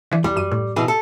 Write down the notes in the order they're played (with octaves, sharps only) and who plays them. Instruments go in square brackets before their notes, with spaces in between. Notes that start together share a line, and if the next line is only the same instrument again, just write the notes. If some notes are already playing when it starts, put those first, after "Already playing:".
[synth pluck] D3 E3
[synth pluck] E2 [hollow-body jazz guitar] G3
[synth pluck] F#2 D#7
A2
[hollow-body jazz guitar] B2 E3 G#4
A4